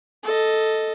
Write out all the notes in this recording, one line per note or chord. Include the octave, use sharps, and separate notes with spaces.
A4 D#5